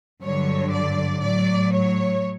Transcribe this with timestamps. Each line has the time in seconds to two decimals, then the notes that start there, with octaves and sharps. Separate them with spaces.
0.22 G2 D3 F#3 C#5
0.72 D5
1.23 A2 F#3 D5
1.72 C#5